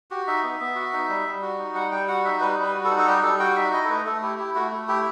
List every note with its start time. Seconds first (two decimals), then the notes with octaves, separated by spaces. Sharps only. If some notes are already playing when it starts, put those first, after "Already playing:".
0.11 F#4 G4
0.27 D#4 E5
0.43 B3
0.60 B3
0.76 F#4
0.93 D#4
1.09 G3
1.25 G3
1.42 F#4
1.59 D#4
1.75 G3 F#5
1.91 G3 G5
2.08 F#4 F#5
2.25 D#4 E5
2.40 G3 B4
2.57 G3 B4
2.74 F#4
2.85 A4
2.90 D#4
2.99 A4
3.06 G3 G4
3.23 G3 A4
3.39 F#4 G5
3.56 D#4 E5
3.72 E4 D#5
3.84 A4
3.89 A3 B4
4.06 A3 A4
4.23 E4 G4
4.39 E4 G4
4.55 A3 F#4
4.72 A3
4.88 E4 G4